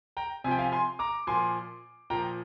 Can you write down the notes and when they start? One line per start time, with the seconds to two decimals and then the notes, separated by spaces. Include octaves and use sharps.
0.17 G5 A#5
0.44 C3 G#5
0.47 F3 G5
0.59 F5 G#5
0.72 G#5 C6
0.99 A#5 D6
1.27 A#2 F3 G#5 C6
2.10 A#2 F3 G5 A#5